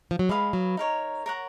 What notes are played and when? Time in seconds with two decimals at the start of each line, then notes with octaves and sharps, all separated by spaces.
0.11 F3
0.19 F#3
0.29 G#3 B4 F5 B5 D#6
0.53 F#3
0.77 D#4 A#4 C#5
1.26 A#4 C#5 F#5 A#5